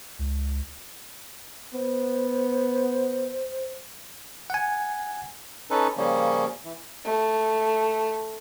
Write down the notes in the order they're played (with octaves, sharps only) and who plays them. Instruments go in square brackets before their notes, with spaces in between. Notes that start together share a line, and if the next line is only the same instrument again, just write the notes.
[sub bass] C#2
[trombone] B3 [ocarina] C5
[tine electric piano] F#5 G#5
[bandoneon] C#4 D#4 A4 B4
C#3 F3 G3 A#3 C#4
E3
[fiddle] A3